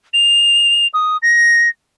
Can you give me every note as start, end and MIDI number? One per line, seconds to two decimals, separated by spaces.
0.13 0.87 101
0.94 1.17 87
1.22 1.68 94